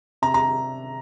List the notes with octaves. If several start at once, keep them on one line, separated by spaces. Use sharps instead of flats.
C3 A#5
A#5